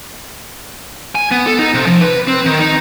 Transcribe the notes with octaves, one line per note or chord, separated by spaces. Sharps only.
G#5
B3
A4
D#4
C3
F3
B4
C4
D#3
D#4